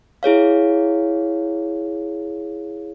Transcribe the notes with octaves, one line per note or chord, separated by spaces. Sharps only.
E4 G#4 C#5 F5